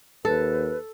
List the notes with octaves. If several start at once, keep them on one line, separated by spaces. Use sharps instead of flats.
D#2 A4 B4